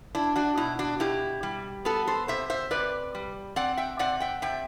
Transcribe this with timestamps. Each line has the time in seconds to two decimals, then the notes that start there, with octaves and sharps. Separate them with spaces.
0.15 D4 E4
0.36 D4 F#4
0.57 B2 E4
0.79 D4 F#4
1.00 B2 E4 G4
1.43 G3
1.85 B3 F#4 A4
2.07 A4 C5
2.28 C3 C5 E5
2.50 C5 E5
2.71 C3 B4 D5
3.15 G3
3.56 C4 D5 F#5
3.77 E5 G5
3.99 C3 D5 F#5
4.20 E5 G5
4.42 C3 E5 G5